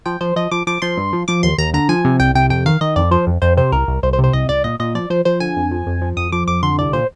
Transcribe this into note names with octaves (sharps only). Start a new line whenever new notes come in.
F3 G5
F3 C5
F3 D#5
F3 D6
F3 D6
F3 C6
G2
F3
F3 D6
D#2 C6
D#2 A#5
D3 A#5
F3 G#5
C3
C2 G5
C3 G5
F2 G5
D#3 F5
D#3 D#5
F2 D5
F3 C5
F2
F2 C5
C3 C5
C2 A#4
C2
C2 C5
C5
C3
C5
C2 D#5
C2 D5
A#2 D#5
A#2 D#5
F3 D5
F3 C5
F3 C5
D3 G#5
F2
F3
F2
F3
F2 D#6
F3 D6
F2 D6
D3 C6
C2 D5
A#2 C5